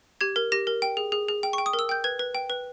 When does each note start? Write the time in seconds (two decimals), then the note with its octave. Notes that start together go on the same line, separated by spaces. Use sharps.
0.21 G4 G#6
0.36 A#4
0.52 G4 A#6
0.67 A#4
0.82 G5
0.97 G#4
1.12 G#4
1.28 G#4
1.43 G5
1.53 G5 C#6
1.66 D#6
1.73 A#4
1.79 E6
1.89 G5 G6
2.04 B4 G#6
2.19 B4
2.35 G5
2.50 B4